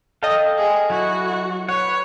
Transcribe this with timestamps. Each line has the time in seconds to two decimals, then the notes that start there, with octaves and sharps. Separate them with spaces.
0.23 A4 D#5 F5 G5
0.57 G#4
0.90 F#3 E4 F#4
1.69 B4 C#5 F#5